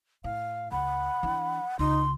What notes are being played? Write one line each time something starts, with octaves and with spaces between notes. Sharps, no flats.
A2 F5
C#2 F#5 B5
E3 D4
C#2 D#4 C6